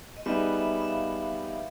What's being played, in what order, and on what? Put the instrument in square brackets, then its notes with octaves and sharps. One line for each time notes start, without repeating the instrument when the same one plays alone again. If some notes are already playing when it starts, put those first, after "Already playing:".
[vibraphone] D#5
[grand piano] G3 B3 D#4 G#4 B4 [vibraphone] E5
[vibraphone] E5
E5
F5